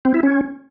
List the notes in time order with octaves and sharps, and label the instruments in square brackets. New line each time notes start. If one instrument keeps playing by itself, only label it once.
[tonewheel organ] C4
E4
C#4